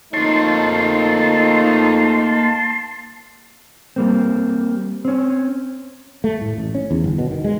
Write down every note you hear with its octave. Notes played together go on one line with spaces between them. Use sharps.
F2 A3 A#3 D#4 C#5 A5 C6
G3 A#3 C4
C4 C#4
A3
A2
A1
C#4
E2
G1
B2
D#3
G#3